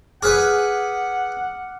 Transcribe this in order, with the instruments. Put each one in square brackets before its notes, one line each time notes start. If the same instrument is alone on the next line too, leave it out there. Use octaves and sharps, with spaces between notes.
[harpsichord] G#4 B4 [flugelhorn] F#5 [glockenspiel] D6 F6